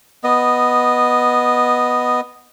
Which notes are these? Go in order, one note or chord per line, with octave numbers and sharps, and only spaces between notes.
B3 D#5